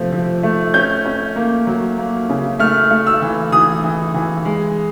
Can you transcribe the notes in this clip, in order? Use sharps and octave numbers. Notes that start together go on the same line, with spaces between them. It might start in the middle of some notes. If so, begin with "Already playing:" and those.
Already playing: C3 F3 A3
F3
A3
C#4 G6
C#4
A#3
F#3
A#3
C#3
A3 F6
A3
E6
E3
E3 D#6
E3
E3
G#3